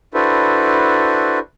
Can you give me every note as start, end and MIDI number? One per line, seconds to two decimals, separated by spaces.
0.14 1.39 62
0.14 1.39 64
0.14 1.39 66
0.14 1.39 69
0.14 1.39 71
0.14 1.39 72